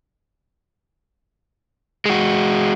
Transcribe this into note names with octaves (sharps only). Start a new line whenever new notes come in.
G#3 F#4